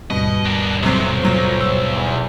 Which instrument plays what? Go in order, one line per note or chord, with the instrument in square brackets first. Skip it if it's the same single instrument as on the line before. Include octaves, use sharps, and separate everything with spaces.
[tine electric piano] D#2 G#2 G3 [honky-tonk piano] B2 [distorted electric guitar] D#5
[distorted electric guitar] D4 A#4
[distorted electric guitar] B1 [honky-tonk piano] C3 F#3 [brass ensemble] C5 C#5
[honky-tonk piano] A#2 F#3
E6
[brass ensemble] E2